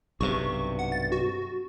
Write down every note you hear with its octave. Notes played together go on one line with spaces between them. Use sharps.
B1 G2 C3 C#6
F#5
A6
F#4